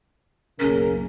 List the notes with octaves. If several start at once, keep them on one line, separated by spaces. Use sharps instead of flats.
F#1 B1 C#3 A#3 C#4 A#4